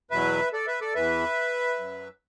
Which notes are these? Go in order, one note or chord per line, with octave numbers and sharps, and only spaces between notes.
E2 B2 F#3 B4 E5
A4 D5
B4 E5
A4 D5
E2 E3 B4 E5
F#2 F#3